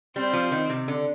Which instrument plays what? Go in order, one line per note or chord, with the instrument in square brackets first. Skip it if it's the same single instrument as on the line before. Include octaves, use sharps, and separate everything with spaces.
[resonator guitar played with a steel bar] G3 [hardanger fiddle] C4
[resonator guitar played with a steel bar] F3
D#3
C3
D3